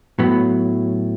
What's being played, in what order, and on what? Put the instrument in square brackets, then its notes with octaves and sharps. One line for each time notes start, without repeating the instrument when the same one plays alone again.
[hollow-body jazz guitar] A2 F#3 B3